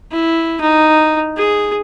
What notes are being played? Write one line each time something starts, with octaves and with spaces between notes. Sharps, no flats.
E4
D#4
G#4